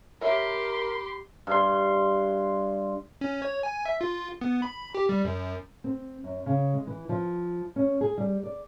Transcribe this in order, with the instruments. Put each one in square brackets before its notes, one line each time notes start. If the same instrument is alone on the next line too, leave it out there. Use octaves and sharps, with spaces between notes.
[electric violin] G4 C6 [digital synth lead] A#4 [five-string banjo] C#5 E5 [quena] B5
[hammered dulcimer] G2 C6
[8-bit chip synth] C#4
C#5
G#5
E5
F4
B3
B5
G4
G3
F#2
[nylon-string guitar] C4
F#2
C#3
G#3
E3
F3
C#4
G#4
G3
D5